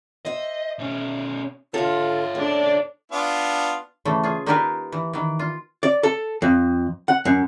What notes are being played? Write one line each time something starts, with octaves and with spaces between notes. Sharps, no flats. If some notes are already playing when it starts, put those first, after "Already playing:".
C5 D#5 E5
B2 C#4
D3 F4 A4 C#5 E5
D3 C#4 D4 D5
B3 D4 F4
C#3 E3 A3
F4 G#4
A#3 D#4 F4 G4 A#4 B4
E3
D#3 E3
F4
D5
A4
F2
F#5
F#2